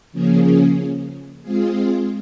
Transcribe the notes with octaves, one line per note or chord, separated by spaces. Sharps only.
C#3 F3 A#3 C#4 G#4
G#3 C4 F4 G#4